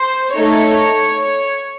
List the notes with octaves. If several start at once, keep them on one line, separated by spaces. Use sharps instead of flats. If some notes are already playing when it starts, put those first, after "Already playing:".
Already playing: C5
A3 D#4 A4 C#5